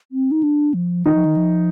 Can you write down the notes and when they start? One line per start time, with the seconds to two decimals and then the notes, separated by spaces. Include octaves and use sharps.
0.12 C4
0.31 D#4
0.43 D4
0.74 F3
1.06 D#3 D#4
1.15 F3
1.25 D#3
1.37 F3